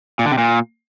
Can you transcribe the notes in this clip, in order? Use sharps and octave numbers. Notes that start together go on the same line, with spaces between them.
A#2
D3
C3
A#2